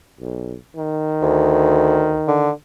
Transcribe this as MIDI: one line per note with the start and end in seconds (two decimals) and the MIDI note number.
0.20 0.55 35
0.76 2.54 51
1.22 2.19 38
2.28 2.51 50